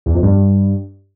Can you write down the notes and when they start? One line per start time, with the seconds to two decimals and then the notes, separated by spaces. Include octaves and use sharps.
0.06 E2
0.14 F2
0.23 G2